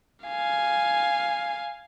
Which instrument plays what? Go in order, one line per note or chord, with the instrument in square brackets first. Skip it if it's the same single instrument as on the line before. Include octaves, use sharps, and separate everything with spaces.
[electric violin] F5 G#5